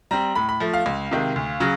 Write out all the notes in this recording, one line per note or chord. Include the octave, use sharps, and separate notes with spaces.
G3 C4 A#5
A2 B5
B5
F3 A3
F5
C#2
C3 D#3 G#3
D2
C#3 F#3